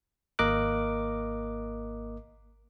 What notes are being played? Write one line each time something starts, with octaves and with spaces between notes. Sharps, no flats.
G#1 A#3 A#4 D#5 D6 F#6